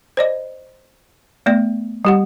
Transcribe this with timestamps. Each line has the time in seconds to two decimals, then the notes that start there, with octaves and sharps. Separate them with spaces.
0.17 C5 D5 D#5
1.46 A3 B3 D5
2.05 G3 G4 F#5